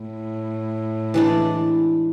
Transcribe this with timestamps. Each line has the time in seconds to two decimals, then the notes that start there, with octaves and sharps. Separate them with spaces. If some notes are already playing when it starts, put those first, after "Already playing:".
Already playing: A2
1.14 E3 G#3 D4